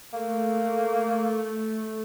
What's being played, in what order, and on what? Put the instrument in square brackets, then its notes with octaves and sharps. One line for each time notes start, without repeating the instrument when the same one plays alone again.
[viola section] A3 [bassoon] A#3